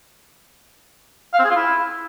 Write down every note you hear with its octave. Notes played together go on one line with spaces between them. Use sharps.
F5
C4
G#4
F4
E4